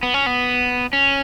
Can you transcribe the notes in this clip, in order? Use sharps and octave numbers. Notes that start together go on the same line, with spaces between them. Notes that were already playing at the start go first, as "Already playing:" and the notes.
B3
C#4
B3
C#4